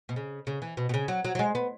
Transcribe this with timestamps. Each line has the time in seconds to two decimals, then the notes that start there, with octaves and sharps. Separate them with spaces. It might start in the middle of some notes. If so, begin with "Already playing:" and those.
0.09 B2
0.16 C#3
0.47 C#3
0.62 E3
0.77 B2
0.89 B2
0.94 C#3
1.08 F#3
1.25 F#3
1.35 F#3
1.39 G#3
1.55 B3